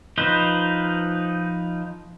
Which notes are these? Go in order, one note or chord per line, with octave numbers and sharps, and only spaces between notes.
F3 D#4 B4 C5